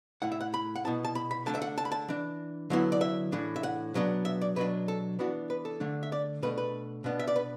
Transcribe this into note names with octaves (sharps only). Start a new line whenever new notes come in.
A2 A3 E4 F#5
E5
F#5
B5
F#5
B2 B3 E4 A5
A5
B5
B5
D3 A3 D4 A5
E5
F#5
A5
B5
A5
E3 D4
D3 F#3 B3 E4
D5
E5
A2 E3 D4
E5
F#5
B2 F#3 B3 D4
E5
D5
B2 F#3 D4 B4
A4
E3 B3 D4 F#4
B4
A4
D3 A3 D4
E5
D5
B2 A3 D4 B4
B4
B2 B3 D4
E5
D5
B4